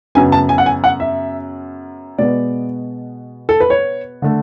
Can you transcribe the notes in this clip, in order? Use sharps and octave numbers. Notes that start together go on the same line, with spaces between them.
F#2 C#3 F#3 B3 G#5
A5
G#5
F#5
G#5
F#5
E5
B2 G#3 B3 D5
A4
B4
C#5
D3 A3